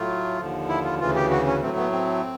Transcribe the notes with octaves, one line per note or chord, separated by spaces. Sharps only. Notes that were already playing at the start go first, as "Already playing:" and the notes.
Already playing: A2 F#3 A3 F4
D#2 D3 F3
E4
F4
D2 C#3 E3 F4
G4
F#4
C#4
A2 F#3 A3 C4
B3
C4